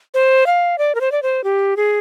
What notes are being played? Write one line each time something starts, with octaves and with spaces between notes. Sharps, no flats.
C5
F5
D5
A#4
C5
D5
C5
G4
G#4